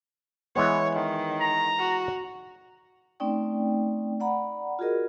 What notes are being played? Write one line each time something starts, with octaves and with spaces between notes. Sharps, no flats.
E3 G#3 B3 C#5
D#3
A#5
F#4
A3 C4 C#4 D#4 D5 G5
D5 F#5 A#5 B5
F4 F#4 G#4 A#4 D#5